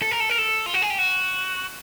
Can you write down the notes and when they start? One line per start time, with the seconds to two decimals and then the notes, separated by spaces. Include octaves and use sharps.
0.02 A4
0.11 A#4
0.20 A4
0.30 A#4
0.38 A4
0.66 F4
0.74 F#4
0.82 G#4
0.90 G4
0.98 F#4